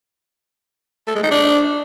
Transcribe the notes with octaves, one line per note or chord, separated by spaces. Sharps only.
A3
G#3
D#4
D4